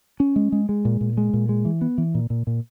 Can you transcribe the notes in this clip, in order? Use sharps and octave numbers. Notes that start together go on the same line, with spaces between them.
C#4
G#3
G#3
G#3
A#2
A#2
G#3
A#2
G#3
E3
B3
E3
A#2
A#2
A#2